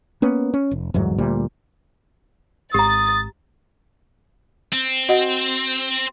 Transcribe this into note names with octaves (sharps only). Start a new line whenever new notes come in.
A#3 B3 C#4
C#4
F1
G1 E2 G#2 F#3
D2 A#2 G3
G#1 G4 A#5 D#6 A6
C4
F#4 D#5 F#5